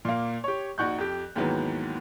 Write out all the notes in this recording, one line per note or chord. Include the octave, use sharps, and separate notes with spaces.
A#2 A#3
G4 C#5
A#1 D#4 F#4 C#6 F#6 G6
F2 G4
D#2 G#2 D#3 E3 F#3 B3